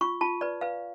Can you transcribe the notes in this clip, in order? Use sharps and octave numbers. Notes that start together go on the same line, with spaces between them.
F4 C#6
F4 A5
B4 D5
B4 F5